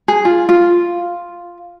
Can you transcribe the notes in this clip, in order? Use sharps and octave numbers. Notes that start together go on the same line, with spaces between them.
G#4
F4
F4